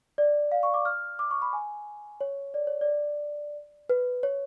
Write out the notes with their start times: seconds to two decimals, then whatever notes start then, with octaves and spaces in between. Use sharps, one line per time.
0.18 D5
0.52 F5
0.63 C#6
0.74 D6
0.85 F6
1.19 D6
1.31 C#6
1.42 B5
1.53 G#5
2.21 C#5
2.54 D5
2.67 C#5
2.81 D5
3.89 B4
4.23 C#5